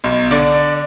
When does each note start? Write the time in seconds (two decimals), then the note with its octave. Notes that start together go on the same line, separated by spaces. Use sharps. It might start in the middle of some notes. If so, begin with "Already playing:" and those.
0.04 B1
0.31 D3 D5